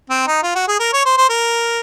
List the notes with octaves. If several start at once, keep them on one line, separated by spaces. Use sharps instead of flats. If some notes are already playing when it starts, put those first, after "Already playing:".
C4
D#4
F4
F#4
G#4
A#4
C#5
C5
C5
A#4